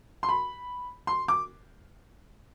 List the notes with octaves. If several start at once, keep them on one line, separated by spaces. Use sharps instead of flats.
C6
B5
C6
D6